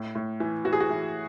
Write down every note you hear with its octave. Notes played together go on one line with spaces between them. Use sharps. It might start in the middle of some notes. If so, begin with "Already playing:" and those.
Already playing: A2
A2
E3
E3 F#4
G#4
F#4
E3